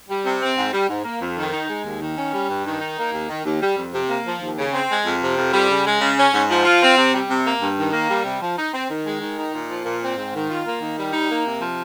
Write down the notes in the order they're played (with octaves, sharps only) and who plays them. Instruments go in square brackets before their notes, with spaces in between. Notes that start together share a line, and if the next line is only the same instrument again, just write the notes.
[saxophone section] G3
C3
C4
G#2
G3
G#2
A#3
F2
D#3
D#4
G#3
D#2
D#3
C#4
G3
G2
D#3
D#4
A#3
D#2
D#3
D#2
G3
F2
C3
A#3
F3
D#2
C#3
C4
G#3
F2
C3
F2
G3
C#3
G#3
C#3
C#4
G#2
F3
F4
C4
C3
G3
C3
A#3
G2
D#3
A#3
G3
C3
F3
D#4
C4
D#3
G#3
D#3
D#4
A#2
F3
A#2
C4
G#2
D#3
F4
A#3
D#3
G3
D#4
A#3
C3
F3